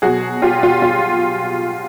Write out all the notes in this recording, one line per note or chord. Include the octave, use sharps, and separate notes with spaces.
B2 F#3 F#4 G#4
F4 G4
F4
F4